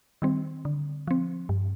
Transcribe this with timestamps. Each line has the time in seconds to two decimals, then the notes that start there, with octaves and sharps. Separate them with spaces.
0.22 D#3 G3 C4
0.65 D3
1.07 F3 C4
1.49 G2